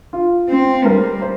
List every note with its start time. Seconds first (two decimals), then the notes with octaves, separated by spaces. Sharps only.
0.13 F4
0.49 C4
0.85 G3 A#4
1.22 C5